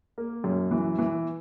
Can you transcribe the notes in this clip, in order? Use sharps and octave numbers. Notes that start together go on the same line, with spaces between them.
A#3
F#2
E3
E3